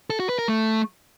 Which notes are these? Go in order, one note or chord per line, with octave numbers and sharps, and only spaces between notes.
A4
F#4
B4
A#4
A3